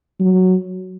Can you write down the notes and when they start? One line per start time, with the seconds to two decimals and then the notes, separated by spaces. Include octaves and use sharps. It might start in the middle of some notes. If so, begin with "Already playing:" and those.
0.20 F#3